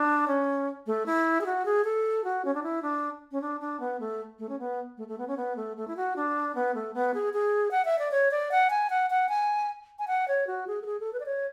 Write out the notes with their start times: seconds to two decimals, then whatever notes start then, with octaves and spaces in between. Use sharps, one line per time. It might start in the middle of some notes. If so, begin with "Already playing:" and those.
Already playing: D4
0.28 C#4
0.87 A3
1.06 E4
1.41 G#4
1.46 F#4
1.65 G#4
1.84 A4
2.24 F#4
2.45 C#4
2.54 D4
2.63 E4
2.82 D4
3.32 C#4
3.41 D4
3.61 D4
3.80 B3
4.00 A3
4.39 A3
4.49 C#4
4.59 B3
4.98 A3
5.08 A3
5.18 B3
5.28 C#4
5.37 B3
5.56 A3
5.77 A3
5.88 E4
5.97 F#4
6.16 D4
6.55 B3
6.75 A3
6.94 B3
7.14 G#4
7.33 G#4
7.71 F#5
7.85 E5
7.99 D5
8.11 C#5
8.31 D5
8.51 F#5
8.70 G#5
8.90 F#5
9.10 F#5
9.29 G#5
9.99 G#5
10.08 F#5
10.28 C#5
10.47 F#4
10.67 G#4
10.82 A4
10.86 G#4
11.00 A4
11.13 B4
11.20 D5
11.26 C#5